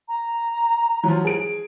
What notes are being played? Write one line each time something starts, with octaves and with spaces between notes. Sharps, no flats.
A#5
F3 F#3
G#4 D7